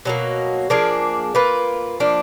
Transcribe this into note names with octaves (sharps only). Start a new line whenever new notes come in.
B2 F#3 A#3
F3 A#3 D4 G#4
A#3 F4 B4
F3 A#3 D4